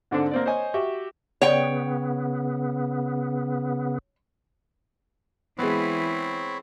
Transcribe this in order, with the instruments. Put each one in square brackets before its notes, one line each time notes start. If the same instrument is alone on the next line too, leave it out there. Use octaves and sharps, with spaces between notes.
[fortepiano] G#2 D3 C4 D4
A#3 C4 D5
C5 C#5 D#5 G#5
F#4 G4 E5
[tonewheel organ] C#3 B3 [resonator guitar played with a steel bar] C#5 G5
[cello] E3 [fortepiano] G#3 B3 [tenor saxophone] C4 [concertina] C#5 B5